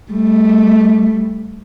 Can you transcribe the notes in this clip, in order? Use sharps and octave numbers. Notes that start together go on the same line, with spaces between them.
G3 A3